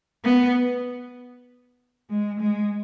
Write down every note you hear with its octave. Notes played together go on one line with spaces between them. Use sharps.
B3
G#3
G#3